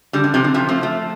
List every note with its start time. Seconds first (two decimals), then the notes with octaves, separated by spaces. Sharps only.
0.13 D3 G3
0.24 D3
0.34 C3 F3
0.44 D3
0.54 C3 F3
0.69 F3 A3
0.83 F3 A3